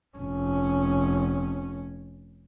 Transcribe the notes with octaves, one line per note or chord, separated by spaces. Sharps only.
F1 C#4